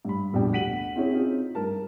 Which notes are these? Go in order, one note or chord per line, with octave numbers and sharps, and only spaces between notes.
G2 B5
F1 A#1 B2 G3 D4 G5
D2 F#5 B6 D#7 F#7
C4 C#4 E4 G#4 C#5
C4 D#4 F4 G#4
G2 A#4 A5